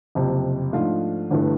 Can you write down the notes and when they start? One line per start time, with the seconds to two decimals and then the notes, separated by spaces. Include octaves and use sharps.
0.15 F#1 F2 C3
0.73 G#2 F3 A3 D4 F4
1.30 G1 G2 E3 A3